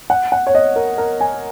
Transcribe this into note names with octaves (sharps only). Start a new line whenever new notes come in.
F#5
F#5
C#5
D#5
A#4
A#4
G#5